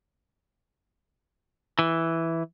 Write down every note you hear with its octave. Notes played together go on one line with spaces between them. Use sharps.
E3